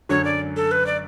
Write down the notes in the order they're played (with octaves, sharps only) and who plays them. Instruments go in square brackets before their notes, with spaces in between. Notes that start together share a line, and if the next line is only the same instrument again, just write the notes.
[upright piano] F#2 D3 F#3 [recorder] C#5
[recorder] D5
A4
B4
D5